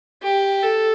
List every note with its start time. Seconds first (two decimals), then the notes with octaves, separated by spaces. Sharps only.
0.23 G4
0.63 A4